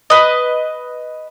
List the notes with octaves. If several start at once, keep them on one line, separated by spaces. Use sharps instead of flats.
B4 D#5